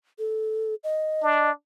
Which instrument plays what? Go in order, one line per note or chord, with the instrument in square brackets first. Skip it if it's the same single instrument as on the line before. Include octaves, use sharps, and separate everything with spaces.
[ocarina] A4
D#5
[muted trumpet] D4